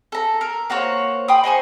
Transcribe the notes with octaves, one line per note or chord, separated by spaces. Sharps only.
A4 A#5
A#4
A#3 F#4 C5 C#5
G5 B5 C6 D#6
D#4 C5 G#5 C#6